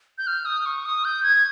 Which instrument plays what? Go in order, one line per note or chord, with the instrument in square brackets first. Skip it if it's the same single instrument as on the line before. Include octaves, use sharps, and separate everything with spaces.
[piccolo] G6
F6
D#6
C#6
D#6
G6
G#6